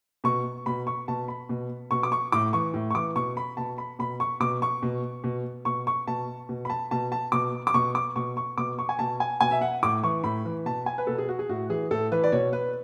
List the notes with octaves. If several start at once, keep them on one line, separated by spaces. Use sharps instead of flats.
B2 C#6
B2 B5
C#6
B2 A5
B5
B2
B2 C#6
D6
C#6
A2 D6
E3 C#6
A2
C#6
E3 D6
B2 C#6
B5
B2 A5
B5
B2 B5
C#6
B2 D6
C#6
B2
B2
B2 C#6
C#6
B2 A5
B2
B5
A5
B2 A5
A5
B2 D6
D6
B2 C#6
D6
B2 C#6
C#6
B2 D6
C#6
G#5
B2 A5
G#5
B2 G#5
E5
F#5
A2 D6
E3 C#6
A2 B5
E3
B2 A5
G#5
B4
B2 A4
G#4
F#4
G#4
A2 F#4
E3 G#4
A2 A4
E3 B4
D5
B2 C#5
B4